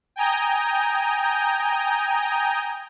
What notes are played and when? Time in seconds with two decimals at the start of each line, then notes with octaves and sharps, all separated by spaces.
0.16 G5 G#5 A#5 D#6 G6